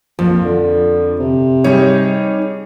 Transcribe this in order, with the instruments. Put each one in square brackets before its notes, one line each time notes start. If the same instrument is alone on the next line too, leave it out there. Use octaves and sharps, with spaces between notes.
[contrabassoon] A#1 [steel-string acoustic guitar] F2 [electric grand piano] F3
[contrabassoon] D3
C3
[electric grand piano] G3 G4 C#5 [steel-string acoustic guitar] D#4 G#4